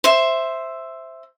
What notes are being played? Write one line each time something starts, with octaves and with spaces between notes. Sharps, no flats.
C5 E5